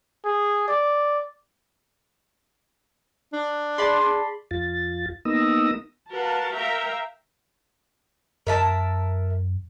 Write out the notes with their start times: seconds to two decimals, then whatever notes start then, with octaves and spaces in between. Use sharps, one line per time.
0.25 G#4
0.68 D5
3.33 D4
3.78 G#4 D5 A5 B5 C6
4.51 F2 F4 A6
5.25 A#3 B3 D#4 D#6 E6 A#6
6.13 F#4 A#4 B4 F5 F#5 A5
6.55 A#4 E5 F5 G5 A#5
8.47 F#2 A#4 E5 A5